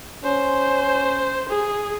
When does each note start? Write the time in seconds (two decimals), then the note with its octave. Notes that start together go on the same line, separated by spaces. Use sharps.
0.24 C#4 C5
1.49 G#4